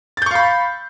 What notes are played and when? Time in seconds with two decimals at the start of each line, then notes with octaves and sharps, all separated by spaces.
0.17 A6
0.22 G6
0.26 C#6
0.31 F5
0.35 B5